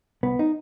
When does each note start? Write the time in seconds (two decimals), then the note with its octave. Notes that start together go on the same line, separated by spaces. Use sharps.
0.23 C2 B3
0.39 D#4